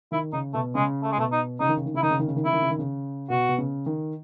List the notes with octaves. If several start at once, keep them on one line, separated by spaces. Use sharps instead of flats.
D#3 E4
C#3 D#4
B2 A3
C#3 G#3
A3
G#3
B2 A3
D#4
C#3 D#4
D#3
C#3
D#3
C#3 E4
D#3 D#4
C#3
D#3
C#3
D#3
C#3 E4
D#3
C#3
D#3
C#3
B2 F#4
B2
C#3
D#3